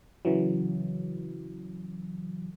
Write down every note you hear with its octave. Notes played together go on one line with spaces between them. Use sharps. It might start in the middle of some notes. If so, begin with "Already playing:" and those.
C#3 E3 F#3